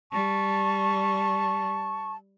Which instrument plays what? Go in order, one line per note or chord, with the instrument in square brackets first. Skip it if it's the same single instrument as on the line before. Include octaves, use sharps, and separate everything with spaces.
[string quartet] G3 [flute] A5 [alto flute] C#6